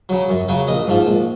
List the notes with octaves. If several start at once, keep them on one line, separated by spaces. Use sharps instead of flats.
C#3 F#3
F#2
C#3 F#3
A#1 D#5
G#2 F3
A#1